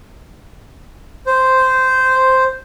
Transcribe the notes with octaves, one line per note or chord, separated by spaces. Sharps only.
C5